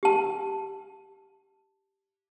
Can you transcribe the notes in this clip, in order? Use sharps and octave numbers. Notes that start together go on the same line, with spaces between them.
G4 A5